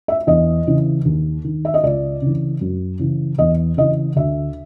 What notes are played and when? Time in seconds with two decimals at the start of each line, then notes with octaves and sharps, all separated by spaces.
0.08 E5
0.27 E2 D#5
0.67 C#3 E3
1.05 D#2
1.44 D#3
1.65 E5
1.74 D#5
1.83 C#2 D5
2.22 C#3 E3
2.61 F#2
2.99 C#3 E3
3.38 E2 D#5
3.77 C#3 E3 D#5
4.16 D2 E5